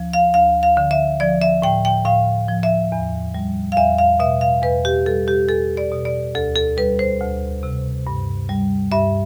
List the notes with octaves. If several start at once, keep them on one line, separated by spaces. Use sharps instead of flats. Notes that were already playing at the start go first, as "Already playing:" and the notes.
Already playing: D2 F3
F5
D2 F5
F5
D3
E5
F3 D5
E5
A2 G5
G5
A2 F5
F3
E5
E2
G3
F5
E2 E5
F5
B2 E5
F5
E2 B4
G4
G3 A4
G4
E2 A4
D5
B2
D5
D2 A4
A4
G3 B4
C5
D2
C3
G2
G3
G2 E5